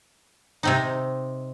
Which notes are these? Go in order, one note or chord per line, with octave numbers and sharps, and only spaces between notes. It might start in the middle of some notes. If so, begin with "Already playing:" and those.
C3 C4 D#4